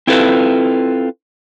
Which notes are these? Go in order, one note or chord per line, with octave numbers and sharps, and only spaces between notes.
C4 E4 F4 A4 B4